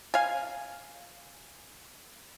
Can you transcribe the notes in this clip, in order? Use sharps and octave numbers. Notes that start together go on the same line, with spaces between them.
F5 G#5